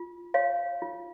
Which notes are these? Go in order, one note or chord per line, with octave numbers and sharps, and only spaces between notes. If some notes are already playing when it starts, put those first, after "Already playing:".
Already playing: F4
C#5 F5
F4